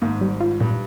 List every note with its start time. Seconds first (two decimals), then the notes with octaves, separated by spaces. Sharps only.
0.02 G#1 G#2 A#3
0.21 G3
0.40 F4
0.60 G2 A#2